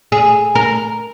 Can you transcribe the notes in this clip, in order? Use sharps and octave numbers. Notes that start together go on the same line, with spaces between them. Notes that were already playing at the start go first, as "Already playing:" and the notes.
G#4
A#4